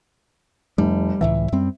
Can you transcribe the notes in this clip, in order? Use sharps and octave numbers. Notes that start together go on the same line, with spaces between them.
F1 G3
C#2 A2 E3 E5
F#2 G3 C4